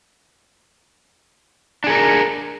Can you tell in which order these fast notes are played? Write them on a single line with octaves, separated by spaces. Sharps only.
D4 G#4 A#4